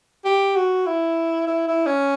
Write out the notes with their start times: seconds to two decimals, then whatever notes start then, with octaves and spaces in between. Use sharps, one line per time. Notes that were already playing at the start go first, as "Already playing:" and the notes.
0.25 G4
0.56 F#4
0.86 E4
1.47 E4
1.67 E4
1.87 C#4